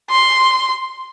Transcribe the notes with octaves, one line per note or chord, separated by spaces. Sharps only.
C6